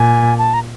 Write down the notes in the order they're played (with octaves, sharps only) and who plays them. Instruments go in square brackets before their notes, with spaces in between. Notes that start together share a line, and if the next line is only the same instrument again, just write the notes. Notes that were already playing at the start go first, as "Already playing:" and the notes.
Already playing: [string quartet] A#2 [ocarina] G#5
[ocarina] A5
A#5